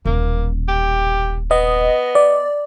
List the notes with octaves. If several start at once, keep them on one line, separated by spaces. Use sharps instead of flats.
D#1 B1 A#3
G4
B3 D#5
D5